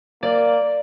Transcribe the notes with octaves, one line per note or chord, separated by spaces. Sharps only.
A#3 D5